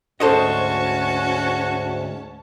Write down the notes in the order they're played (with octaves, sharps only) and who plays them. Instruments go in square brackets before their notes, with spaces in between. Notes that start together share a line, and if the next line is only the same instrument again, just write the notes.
[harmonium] D2 G#2 [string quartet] C#4 A5 [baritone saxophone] F#4 [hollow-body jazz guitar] A4 C5 D#5